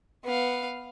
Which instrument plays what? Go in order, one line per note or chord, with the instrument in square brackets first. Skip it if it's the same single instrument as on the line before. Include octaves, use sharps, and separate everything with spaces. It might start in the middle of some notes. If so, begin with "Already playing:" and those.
[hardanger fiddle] B3 F5